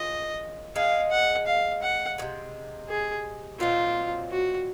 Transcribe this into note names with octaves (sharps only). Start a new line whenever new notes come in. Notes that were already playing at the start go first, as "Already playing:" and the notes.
Already playing: D#3 G#3 C#4 F4 D#5
G#3 D#4 G#4 F5
F#5
F5
F#5
C3 D#3 G#3
G#4
A#2 F#3 C4 D#4 F4
F#4